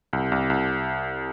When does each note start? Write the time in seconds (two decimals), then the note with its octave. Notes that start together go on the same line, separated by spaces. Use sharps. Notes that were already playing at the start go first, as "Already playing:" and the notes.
0.13 C2
0.32 C2
0.50 C2